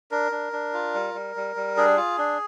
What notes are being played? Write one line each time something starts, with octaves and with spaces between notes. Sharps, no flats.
D4 A#4
D4
D4
F4
G3
G3
G3
G3
D4 G#4
F4
D4